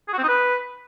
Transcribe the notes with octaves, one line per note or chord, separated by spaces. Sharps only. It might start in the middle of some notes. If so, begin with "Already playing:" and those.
G#4
F#4
C4
D#4
B4